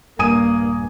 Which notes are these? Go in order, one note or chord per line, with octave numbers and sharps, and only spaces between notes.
D#1 G2 A#3 G#5 D#6 D#7